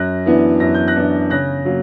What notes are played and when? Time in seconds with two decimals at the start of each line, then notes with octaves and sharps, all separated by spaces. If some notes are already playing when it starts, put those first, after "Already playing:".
Already playing: F#2 F#6 A#6
0.26 E3 B3 D4
0.60 F#2 A#6
0.74 G6
0.88 F#6 A#6
0.96 E3 B3 D4
1.30 C#3 F#6 A#6
1.65 F#3 A#3